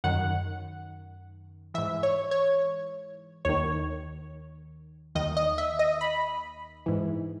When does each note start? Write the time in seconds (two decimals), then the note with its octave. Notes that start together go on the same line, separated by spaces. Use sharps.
0.04 F#2 D#3 F#5
1.74 G#2 E3 E5
2.03 C#5
2.31 C#5
3.45 D#2 D#3 C#5
5.15 D#2 D#3 D#5
5.37 D#5
5.58 E5
5.79 D#5
6.01 B5
6.86 G#2 E3